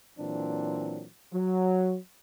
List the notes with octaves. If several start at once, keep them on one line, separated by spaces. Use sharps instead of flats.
A#2 E3 F#3 C4 D4
F#3